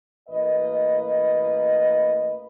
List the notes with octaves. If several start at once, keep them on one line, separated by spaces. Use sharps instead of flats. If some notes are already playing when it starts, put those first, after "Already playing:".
A1 A#3 B4 D#5